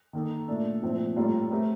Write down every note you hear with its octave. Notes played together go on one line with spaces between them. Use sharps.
D#3 A#3 D#4 A4
A#2 A3 D4 A4
A#2 F3 A3 C4
A2 G3 A#3 F4 A4
A3 C4 G4 A#4